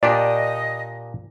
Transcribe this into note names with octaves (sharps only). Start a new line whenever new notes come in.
A#2 D4 G4 D5 D#5